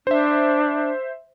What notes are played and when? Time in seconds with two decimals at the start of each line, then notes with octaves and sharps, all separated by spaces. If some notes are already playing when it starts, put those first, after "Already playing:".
0.07 D4 C5 E5